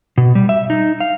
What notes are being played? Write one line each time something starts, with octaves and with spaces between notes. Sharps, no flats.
B2
G3
E5
D#4
F5